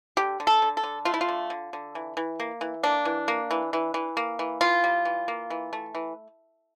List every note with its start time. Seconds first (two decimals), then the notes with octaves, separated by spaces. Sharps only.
0.17 D3 G4
0.40 D3
0.47 A4
0.62 D3
0.77 A4
0.84 D3
1.05 A3 F4
1.14 E4
1.21 F4
1.28 D3
1.50 D3
1.73 D3
1.95 E3
2.17 E3
2.40 A#3
2.61 E3
2.83 A#3 D4
3.05 E3
3.28 A#3
3.51 E3
3.73 E3
3.94 E3
4.17 A#3
4.39 E3
4.61 E3 F4
4.84 G3
5.05 E3
5.28 A#3
5.50 E3
5.73 A3
5.95 E3